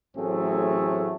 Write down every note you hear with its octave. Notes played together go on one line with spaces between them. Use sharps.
A1 F#3 A3 C4 G#4